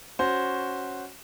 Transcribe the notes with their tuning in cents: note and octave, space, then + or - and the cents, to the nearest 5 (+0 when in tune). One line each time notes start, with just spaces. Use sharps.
C#4 +0 F#4 +0 C5 +0